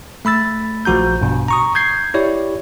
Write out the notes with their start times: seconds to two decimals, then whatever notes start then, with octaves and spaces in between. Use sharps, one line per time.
0.25 A3 B5 E6 A6
0.85 A#1 F3 F#4 A#5 G6
1.21 G2 B2
1.48 A#5 C#6 D#6
1.75 G6 G#6 C7
2.14 E4 G4 C#5 D5